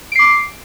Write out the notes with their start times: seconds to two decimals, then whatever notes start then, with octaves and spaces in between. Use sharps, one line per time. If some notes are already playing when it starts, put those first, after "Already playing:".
0.12 D7
0.16 C7
0.19 D6